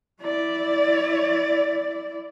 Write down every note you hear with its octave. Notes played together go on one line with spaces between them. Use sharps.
E4 D5